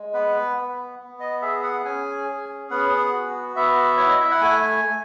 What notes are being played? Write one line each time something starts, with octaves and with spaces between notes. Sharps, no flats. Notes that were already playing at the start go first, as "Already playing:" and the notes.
Already playing: G#3
B3 B4
B3
B3
D#5
G#4 E5
F#5
C#4 G#5
G#4
B3 F#5
F#4
B3 E5
E4 C#5
D#5
E5
F#5
A3 G#5
A3